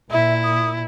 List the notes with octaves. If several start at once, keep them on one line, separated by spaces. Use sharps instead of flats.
A#2 E4 E5
D#6